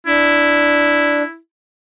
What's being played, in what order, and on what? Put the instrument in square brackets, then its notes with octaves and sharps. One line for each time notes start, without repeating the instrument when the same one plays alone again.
[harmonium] D4 [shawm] E4